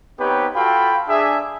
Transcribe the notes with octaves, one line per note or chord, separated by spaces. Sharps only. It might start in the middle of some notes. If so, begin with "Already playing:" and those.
B3 C4 D#4 G4 B4 C#5
F4 F#4 A4 F5 G5 B5
D4 G#4 E5